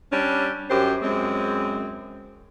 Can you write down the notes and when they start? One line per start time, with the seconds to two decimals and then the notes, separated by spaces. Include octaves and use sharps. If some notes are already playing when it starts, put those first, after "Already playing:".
0.12 G3 C#4 D4
0.70 F#2 G4 C5
1.02 F#2 G#3 C4